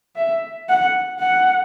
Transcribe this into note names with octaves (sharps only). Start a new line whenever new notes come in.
E5
F#5
F#5